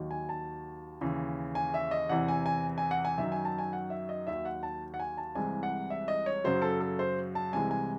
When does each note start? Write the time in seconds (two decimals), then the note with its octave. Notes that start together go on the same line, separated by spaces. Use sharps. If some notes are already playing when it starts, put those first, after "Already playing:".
Already playing: D#2 D#3 F#3
0.11 G#5
0.29 A5
1.01 D#2 C#3 E3
1.55 G#5
1.74 E5
1.91 D#5
2.09 E2 C3 E3 F#5
2.28 G#5
2.46 G#5
2.78 G#5
2.91 F#5
3.05 G#5
3.18 F#2 D#3 F#3 E5
3.32 G#5
3.45 A5
3.58 G#5
3.73 F#5
3.90 E5
4.09 D#5
4.27 D#2 D#3 F#3 E5
4.45 F#5
4.63 A5
4.94 F#5
5.00 G#5
5.18 A5
5.35 C2 C3 E3 G#3 G#5
5.63 F#5
5.90 E5
6.08 D#5
6.26 C#5
6.44 F#2 C#3 F#3 C5
6.62 A4
6.80 A4
6.99 C5
7.35 A5
7.53 C2 C3 E3 G#3 G#5
7.71 G#5